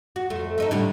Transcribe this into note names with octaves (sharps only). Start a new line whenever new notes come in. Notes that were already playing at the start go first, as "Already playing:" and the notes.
F#4
F2 A3
A3 D#4 A4
A2 D3 G3